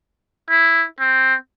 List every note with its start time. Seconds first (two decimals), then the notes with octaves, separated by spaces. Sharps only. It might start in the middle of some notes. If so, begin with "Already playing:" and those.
0.50 E4
1.00 C4